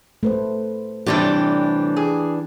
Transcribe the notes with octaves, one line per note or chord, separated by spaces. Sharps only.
A3 B4 C5
A2 C3 E3 G3 D4 G4
G#4